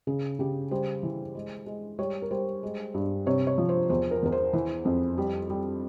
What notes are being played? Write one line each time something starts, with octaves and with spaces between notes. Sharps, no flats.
C#3 G#4
C#3 G4
G3 C5
E3
G#3
G#3
G3 C#5
A#4
G3 C5
G#3
G2
C3 C#5
C#5
F3
C5
E2 C5
A#4
E2 A#4
C5
E3
F2
G3
G3